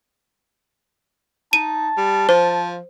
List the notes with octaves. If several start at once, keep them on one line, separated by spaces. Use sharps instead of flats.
D#4 A5 D#7
G3
F3 C5